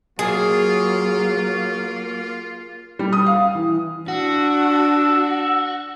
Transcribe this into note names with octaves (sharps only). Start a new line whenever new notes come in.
F#3 A#3 F4 G#4
G3
D#6
F5
E3
D4 F#4 E6